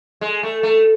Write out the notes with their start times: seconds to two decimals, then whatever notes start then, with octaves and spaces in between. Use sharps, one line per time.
0.21 G#3
0.43 A3
0.63 A3